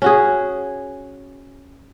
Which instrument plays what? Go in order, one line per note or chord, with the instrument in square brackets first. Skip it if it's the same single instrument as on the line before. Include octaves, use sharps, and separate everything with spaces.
[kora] C#4 F#4 G#4